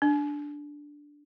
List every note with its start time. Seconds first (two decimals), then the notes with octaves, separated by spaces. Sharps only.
0.02 D4